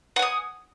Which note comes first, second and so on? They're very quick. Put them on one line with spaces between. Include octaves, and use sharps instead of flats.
F#5 G#5 D#6